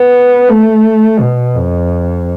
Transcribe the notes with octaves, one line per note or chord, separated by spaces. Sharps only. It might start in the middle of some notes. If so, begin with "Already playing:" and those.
Already playing: B3
A3
B2
F2